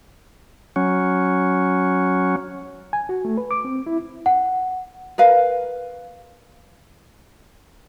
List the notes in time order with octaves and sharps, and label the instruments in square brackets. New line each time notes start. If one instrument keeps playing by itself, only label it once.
[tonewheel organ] F#3 C#4
[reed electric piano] G#5
F#4
A3
B4
D6
C4
E4
[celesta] F#5
[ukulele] A#4 B4 F5